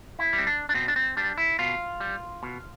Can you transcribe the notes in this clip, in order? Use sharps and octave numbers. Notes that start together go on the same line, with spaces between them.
E4
G3
C4
D4
D4
B2 C4
D4
C4
G3 D4
E4
B2 F4
G3
B2